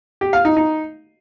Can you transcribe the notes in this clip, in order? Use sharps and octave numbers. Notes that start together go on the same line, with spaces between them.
G4
F5
D#4
D#4